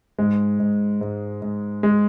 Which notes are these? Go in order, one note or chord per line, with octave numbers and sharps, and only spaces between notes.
G#2 G#3
G#2
G#2
G#2
G#3